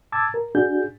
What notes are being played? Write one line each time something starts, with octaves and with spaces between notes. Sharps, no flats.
A5 D6 E6 G#6 A6
A#4
D4 F#4 G#4 G6